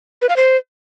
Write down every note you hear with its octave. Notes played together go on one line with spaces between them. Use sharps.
B4
F5
C5